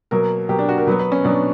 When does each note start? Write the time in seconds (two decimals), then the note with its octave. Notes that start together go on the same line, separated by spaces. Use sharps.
0.11 B2 F#3 A#3 A#4
0.49 B2 F#3 A#3 G4
0.59 D4
0.69 F#4
0.78 A#4
0.87 B2 F#3 B3 B4
0.99 B4
1.12 C#4
1.24 B2 F#3 B3 D4